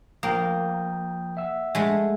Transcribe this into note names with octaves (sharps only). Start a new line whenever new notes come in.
F3 A#3 G5 D#6
E5 F#5 E6
G#3 A3